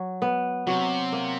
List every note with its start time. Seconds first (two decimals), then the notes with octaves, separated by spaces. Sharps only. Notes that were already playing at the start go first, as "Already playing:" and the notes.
Already playing: F#3
0.22 B3
0.67 C3 F#3
1.12 A#3